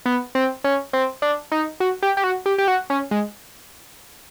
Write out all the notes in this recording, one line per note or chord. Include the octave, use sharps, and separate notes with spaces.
B3
C4
C#4
C4
D4
D#4
F#4
G4
G4
F#4
G4
G4
F#4
C#4
G#3